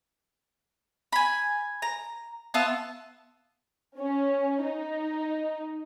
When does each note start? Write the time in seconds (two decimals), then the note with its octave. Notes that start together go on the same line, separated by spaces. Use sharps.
1.12 G#5 B5
1.82 A#5
2.54 B3 F4 E5 A5
3.98 C#4
4.64 D#4